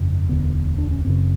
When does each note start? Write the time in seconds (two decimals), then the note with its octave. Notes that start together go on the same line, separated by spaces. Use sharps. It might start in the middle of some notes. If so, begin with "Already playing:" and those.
Already playing: G1 F2 C#3
0.29 E1 D2 D3 B3
0.78 D4
0.91 C#4
1.05 F#1 F#2 C#3 C4